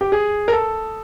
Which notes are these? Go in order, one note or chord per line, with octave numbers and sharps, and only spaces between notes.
G4
G#4
A#4
A4